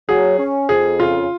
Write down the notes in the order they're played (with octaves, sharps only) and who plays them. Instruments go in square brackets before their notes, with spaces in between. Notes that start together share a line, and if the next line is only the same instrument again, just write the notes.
[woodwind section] F#3 [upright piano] G#4
[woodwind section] C#4
[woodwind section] F2 [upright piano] G#4
[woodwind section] C#3 [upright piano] F4